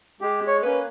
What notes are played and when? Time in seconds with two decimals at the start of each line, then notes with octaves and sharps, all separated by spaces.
0.21 G#3 G4
0.47 C#5
0.63 A#3 C#4 B4